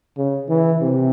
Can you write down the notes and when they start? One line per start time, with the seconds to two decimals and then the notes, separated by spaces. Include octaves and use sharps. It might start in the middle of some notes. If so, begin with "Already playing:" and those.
0.17 C#3
0.49 E3
0.81 C3